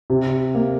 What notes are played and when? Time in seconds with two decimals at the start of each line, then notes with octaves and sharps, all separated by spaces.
0.10 C3
0.55 A#3